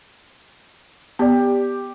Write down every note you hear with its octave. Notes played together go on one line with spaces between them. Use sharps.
B3 G4 D5